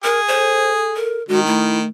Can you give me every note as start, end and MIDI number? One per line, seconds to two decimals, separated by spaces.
0.04 0.95 68
0.04 0.20 70
0.28 1.18 69
0.28 0.72 72
0.96 1.23 70
1.29 1.84 51
1.29 1.46 56
1.29 1.40 66
1.46 1.89 57
1.46 1.79 64